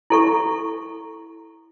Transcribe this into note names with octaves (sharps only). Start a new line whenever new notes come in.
E4 A4 C#6